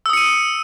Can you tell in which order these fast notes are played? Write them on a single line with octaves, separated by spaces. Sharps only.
E6 D#6 C#7 D#7